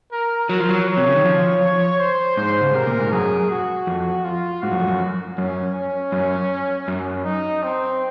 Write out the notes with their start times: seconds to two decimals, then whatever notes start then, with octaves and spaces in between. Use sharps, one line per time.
0.12 A#4
0.49 F#3 A#4
0.60 F3
0.69 F#3
0.88 C#5
0.97 C3
1.07 C#3
1.16 D#3
1.25 F3
2.00 C5
2.37 G#2 C5
2.63 C#3
2.74 C3 A#4
2.87 A#2
3.00 G#2
3.12 F#2 G#4
3.50 F#4
3.87 F2
4.24 F4
4.62 G#2 F#4
4.71 F#2
4.80 F2
4.88 F#2
5.38 F#2 C#4
5.74 C#4
6.12 F#2
6.88 F#2
7.25 D#4
7.63 C4